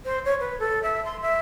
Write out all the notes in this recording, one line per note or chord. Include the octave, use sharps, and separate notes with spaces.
C5
C#5
B4
A4
E5
C6
E5